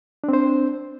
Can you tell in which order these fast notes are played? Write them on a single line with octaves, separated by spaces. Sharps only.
D4 C4 C5